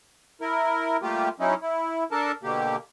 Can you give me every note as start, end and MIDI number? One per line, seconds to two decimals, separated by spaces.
0.41 0.97 64
0.41 0.97 70
1.02 1.29 55
1.02 1.29 57
1.02 1.29 58
1.02 1.29 65
1.02 1.29 67
1.40 1.54 54
1.40 1.54 61
1.40 1.54 63
1.40 1.54 64
1.62 2.04 64
2.12 2.32 62
2.12 2.32 69
2.12 2.32 70
2.12 2.32 81
2.43 2.76 47
2.43 2.76 50
2.43 2.76 58
2.43 2.76 67